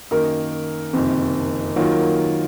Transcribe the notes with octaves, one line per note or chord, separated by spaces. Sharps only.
F#2 D#3 A#3 D#4 A#4
F#1 F2 C3 D#3
D#3 F#3 A#3 F4